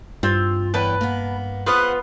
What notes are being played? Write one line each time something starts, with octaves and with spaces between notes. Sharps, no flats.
G2 C4 F4
E2 B4 C#5 G5 A5
A#3 B3
B3 F4 G#4 B4 C5 F#5